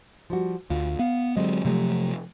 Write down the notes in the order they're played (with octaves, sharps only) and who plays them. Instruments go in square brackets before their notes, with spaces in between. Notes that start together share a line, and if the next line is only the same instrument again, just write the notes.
[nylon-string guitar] F3 G3 F#4
[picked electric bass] D2 [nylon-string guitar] F4
[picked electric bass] B3 [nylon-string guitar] F5
[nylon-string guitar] D3 C4 D#5 [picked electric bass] F#3 G#3
[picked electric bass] C3 F3 A3 [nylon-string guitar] F#3 G#3 G4